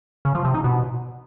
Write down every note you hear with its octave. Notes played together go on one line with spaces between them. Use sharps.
C#3
F3
C3
D#4
B2